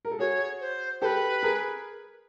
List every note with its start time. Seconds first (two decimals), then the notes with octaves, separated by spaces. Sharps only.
0.05 A#4
0.11 A4
0.19 F#4 G#4 C#5
0.61 C5
1.01 G4 A4 B4 C5
1.43 G#4 A#4